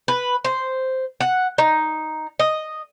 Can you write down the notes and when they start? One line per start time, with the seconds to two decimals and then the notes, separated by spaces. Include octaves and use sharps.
0.08 B4
0.45 C5
1.20 F#5
1.58 D#4
2.39 D#5